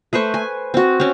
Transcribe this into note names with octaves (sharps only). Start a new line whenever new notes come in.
A3 B4 C5 C#6
G#5
C4 F#4
C4 C#4